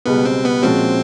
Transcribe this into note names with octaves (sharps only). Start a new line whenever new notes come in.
C#2 B2 G3 B3
C4
B3
A#2 F3 G#3 C4 C#4 F#4